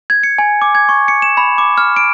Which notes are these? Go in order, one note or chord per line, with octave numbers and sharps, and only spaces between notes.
G#6
C#7
G#5
D6
G#6
C#6
C#7
E7
B5
D6
F6
D7